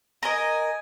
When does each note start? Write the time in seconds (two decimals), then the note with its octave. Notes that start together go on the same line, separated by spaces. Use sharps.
0.23 A#4 D#5 G#5